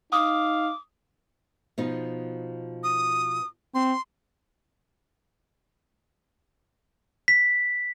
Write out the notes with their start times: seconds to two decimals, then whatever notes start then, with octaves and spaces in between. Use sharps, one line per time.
0.13 D#4 F5 D6 D#6
1.78 B2 F3 D#4
2.83 D#6
3.75 C4 C6
7.28 B6